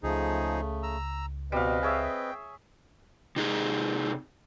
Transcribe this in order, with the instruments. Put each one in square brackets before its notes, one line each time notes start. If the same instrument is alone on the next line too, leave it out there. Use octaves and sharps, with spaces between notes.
[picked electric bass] C#2 [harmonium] C#3 A3 [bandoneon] F3 D#4 G#4
[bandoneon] A#5 E6
[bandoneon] B2 [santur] G3 F5 [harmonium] C4 B4 D#5
[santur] G#4 C#5 E5 [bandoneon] G5
[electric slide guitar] C3 D#4 G#4